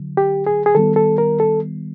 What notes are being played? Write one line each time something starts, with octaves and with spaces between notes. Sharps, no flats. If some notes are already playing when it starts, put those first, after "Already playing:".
Already playing: D3 F#3
G4
G#4
G#4
D#3 G3 B3 A4
A4
A#4
A4